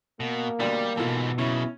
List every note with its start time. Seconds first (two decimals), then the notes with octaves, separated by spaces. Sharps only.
0.20 B2 A#3
0.60 D2 B2 G3 D4
0.97 G#2 B2 E3 F4 A4
1.38 F#2 C#3 C#4 E4